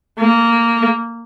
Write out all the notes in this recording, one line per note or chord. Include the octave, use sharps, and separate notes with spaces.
A#3